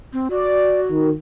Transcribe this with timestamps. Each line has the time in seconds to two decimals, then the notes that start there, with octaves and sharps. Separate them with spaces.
0.13 C4
0.30 F#4 D5
0.89 D#3